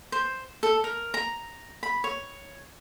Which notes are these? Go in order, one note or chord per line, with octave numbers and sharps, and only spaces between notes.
C5
A4
A#4
A#5
B5
C#5